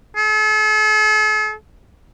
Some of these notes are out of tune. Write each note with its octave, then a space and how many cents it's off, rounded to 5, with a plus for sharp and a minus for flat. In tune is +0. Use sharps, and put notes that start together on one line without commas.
A4 -45